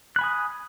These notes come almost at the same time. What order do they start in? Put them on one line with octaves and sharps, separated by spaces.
F#6 B5 G#5 D#6